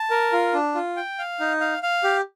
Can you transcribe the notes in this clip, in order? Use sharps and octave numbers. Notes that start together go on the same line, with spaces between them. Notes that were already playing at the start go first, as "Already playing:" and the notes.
Already playing: A5
A#4
F4
D4
F4
G5
F5
D#4
F5
F5
G4